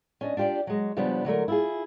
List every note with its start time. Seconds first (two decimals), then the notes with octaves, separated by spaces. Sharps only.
0.21 C#4 D4 D#5
0.37 D4 F4 G4 C#5 D5
0.67 F#3 G#3
0.97 C#3 F3 G3 B3 D4
1.25 D3 F#3 A3 A#4
1.48 E4 F4 G#4